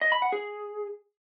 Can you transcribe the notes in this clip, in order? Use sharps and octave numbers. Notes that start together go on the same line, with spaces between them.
D#5
B5
F#5
G#4